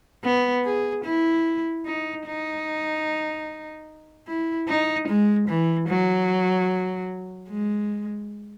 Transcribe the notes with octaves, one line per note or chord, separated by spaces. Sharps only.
B3
G#4
E4
D#4
D#4
E4
D#4
G#3
E3
F#3
G#3